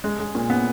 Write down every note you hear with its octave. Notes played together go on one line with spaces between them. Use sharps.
G#3
G#3
A#2
B3